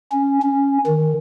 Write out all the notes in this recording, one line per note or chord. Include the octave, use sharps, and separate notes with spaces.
C#4
C#4
D#3